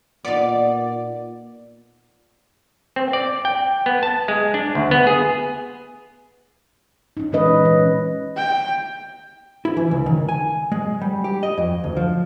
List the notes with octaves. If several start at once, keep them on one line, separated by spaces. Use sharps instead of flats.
A#2 B3 D#4 D5
C4
D5
G5
B3
A5
G#3
D4
D2
B3
G#4
C#4 D#4
A#2 E3 G#3 C#4 B4 D#5
C#4
G5
E4
E3
C#2
D#3
G#5
G#3
G3
G4
D#5
F2
D2
F3